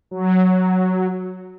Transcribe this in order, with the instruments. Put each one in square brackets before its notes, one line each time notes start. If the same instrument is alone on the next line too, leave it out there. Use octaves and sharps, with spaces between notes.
[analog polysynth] F#3